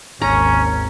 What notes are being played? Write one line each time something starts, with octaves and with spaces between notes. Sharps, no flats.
G#1 D#2 C#4 A#5